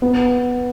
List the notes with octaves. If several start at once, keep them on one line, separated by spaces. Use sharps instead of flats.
B3